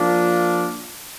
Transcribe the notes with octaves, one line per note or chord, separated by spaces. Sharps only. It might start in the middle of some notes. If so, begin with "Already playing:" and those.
Already playing: F3 A#3 D4 F4